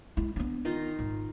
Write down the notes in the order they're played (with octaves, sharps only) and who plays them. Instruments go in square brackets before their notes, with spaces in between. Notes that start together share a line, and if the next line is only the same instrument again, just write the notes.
[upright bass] G#3 E4
B3 D4
[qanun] D#3 D#4 F4
[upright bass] G#1